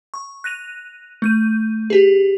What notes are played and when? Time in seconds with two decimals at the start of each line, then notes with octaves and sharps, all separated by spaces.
0.14 C#6
0.44 F#6 A#6 D#7 F7
1.22 A3 G6 D#7
1.90 G4 G#4